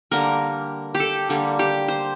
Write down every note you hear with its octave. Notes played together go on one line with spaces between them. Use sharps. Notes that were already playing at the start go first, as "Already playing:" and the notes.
D3 G3 A#3 A#4
G4
A4
D3 G3 A#3
G4
C5